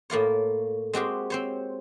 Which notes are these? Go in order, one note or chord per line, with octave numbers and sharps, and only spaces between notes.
A2 A#3 F4 C#5
G#3 C4 F#4 G4
C4 C5 C#5